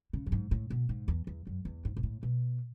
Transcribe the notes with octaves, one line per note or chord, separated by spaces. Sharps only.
C#3
F#2
G#2
A2
B2
G#2
E2
E2
F#2
E2
G#2
B2
A2
B2